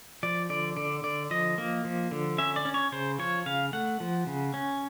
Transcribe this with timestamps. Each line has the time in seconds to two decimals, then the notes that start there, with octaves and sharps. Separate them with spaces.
0.23 F3 D5
0.50 D3 D5
0.77 D3 D5
1.03 D3 D5
1.31 F3 D#5
1.58 A#3
1.85 F3
2.11 D3
2.38 C#4 E5
2.56 D5
2.65 C#4
2.74 C#5
2.92 C#3 C5
3.19 F3 C#5
3.46 C#3 F5
3.73 A3 F#5
4.00 F3
4.27 C#3
4.54 C#4